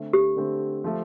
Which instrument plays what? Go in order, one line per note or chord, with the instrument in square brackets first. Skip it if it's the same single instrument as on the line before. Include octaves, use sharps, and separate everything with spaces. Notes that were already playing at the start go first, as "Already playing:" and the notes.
Already playing: [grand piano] D3 A3 C4
[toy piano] G4
[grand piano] D3 A3 C4
F3 A3